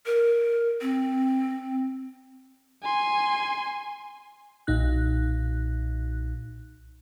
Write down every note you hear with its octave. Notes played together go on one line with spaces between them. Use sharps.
A#4
C4
G#5 C6
B1 A#2 D#4 F#6